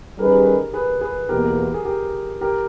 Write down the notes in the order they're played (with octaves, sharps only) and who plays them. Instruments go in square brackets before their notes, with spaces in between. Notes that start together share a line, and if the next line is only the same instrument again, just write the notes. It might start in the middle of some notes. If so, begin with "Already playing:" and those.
[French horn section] D#3 G3 C#4 G#4 B4 [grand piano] G4 A#4
[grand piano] G#4 B4
G#4 B4
[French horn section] E2 B2 A#3 [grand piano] G4 A#4
[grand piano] G#4
G4 A#4
G4 A#4